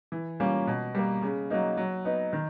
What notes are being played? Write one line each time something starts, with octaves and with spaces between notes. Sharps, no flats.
E3
G3 A#3 C#4 F4
B2
G3 A#3
C#3
F#3 A#3 D#4
F#3
B3 D#4
D#3